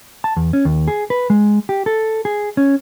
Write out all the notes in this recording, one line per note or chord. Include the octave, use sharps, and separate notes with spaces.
A5
E2
C#4
D#2
G#4
B4
G#3
G4
A4
G#4
C#4